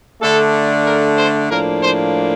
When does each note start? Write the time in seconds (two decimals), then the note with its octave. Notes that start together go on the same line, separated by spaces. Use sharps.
0.21 D3 A3 D4 A4
0.86 A#4
1.17 C5
1.50 A2 F3 A#3 D4 A#4
1.81 C5